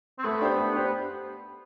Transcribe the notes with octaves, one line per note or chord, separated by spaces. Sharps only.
C4
A3 B3
D4 G4 C5
A3
D4 G4 C5